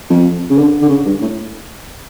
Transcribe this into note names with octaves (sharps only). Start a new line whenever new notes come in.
F2
C#3
D3
D3
C#3
G2
A2